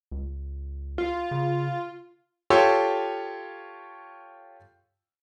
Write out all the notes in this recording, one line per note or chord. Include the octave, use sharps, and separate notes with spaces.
C#2
F4
C#3
F4 G4 A4 C#5 C6 E6